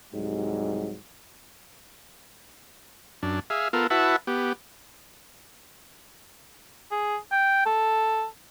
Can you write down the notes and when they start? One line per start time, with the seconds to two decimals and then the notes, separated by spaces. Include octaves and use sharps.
0.12 C2 G#2 F#3 G3
3.23 F#2 D4
3.50 G#4 E5 F5
3.73 B3 F4 A4 A#4
3.90 E4 F#4 B4 E5 F#5 A5
4.27 B3 G4
6.91 G#4
7.31 G5
7.66 A4